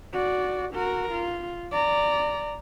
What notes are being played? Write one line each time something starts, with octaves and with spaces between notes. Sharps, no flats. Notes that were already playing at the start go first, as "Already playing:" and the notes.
F#4 D5
F#4 A#4
F4
D5 A#5